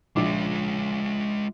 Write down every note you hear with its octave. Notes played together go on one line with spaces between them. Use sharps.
A#1 G#3 F4 D6